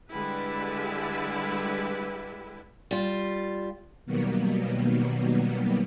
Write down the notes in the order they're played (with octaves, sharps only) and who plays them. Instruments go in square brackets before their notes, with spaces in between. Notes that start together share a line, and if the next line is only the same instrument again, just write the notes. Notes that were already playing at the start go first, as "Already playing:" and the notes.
[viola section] D3 G3 G#3 E4 G4 B4
[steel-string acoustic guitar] G3 F4
[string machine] B2 D#3 F#3 G3 A#3 B3